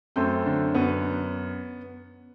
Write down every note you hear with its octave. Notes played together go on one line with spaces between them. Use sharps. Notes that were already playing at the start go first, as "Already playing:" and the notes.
F#2 A3 C4
D3
F#2 B3